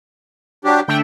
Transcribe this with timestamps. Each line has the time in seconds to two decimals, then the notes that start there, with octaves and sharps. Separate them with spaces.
0.65 F#3 D4 G4
0.88 D3 A3 D4 G5